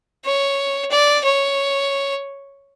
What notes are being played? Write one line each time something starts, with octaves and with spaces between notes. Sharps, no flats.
C#5
D5
C#5